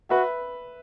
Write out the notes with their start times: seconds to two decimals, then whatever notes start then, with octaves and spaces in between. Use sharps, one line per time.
0.10 F#4 B4 E5